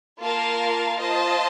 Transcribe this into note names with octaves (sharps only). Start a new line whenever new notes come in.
A#3 F4 A#4 F5 A5
F4 C5 D#5 A5